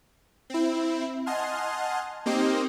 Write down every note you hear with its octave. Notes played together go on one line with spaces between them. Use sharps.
C4 E4
D#5 F#5 G#5 A5 C6 F6
A#3 C4 D#4 G4 C5 D#5